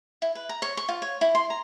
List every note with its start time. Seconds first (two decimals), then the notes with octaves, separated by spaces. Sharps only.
0.22 E4
0.35 B4
0.49 A#5
0.62 C#5
0.77 C#6
0.89 F4
1.02 C#5
1.21 E4
1.35 C6
1.50 A#5